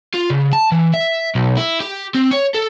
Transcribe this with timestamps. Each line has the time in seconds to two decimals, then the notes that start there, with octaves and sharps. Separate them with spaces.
0.14 F4
0.30 C#3
0.53 A5
0.72 E3
0.94 E5
1.35 B1
1.57 E4
1.81 G4
2.15 C4
2.31 C#5
2.54 A4